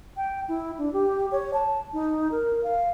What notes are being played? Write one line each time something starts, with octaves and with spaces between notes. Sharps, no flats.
G5
E4
D4
G4
C#5
A5
D#4
A#4
F5